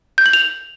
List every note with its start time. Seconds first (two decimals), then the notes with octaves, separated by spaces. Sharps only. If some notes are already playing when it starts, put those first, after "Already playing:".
0.18 G6
0.26 F#7
0.33 F7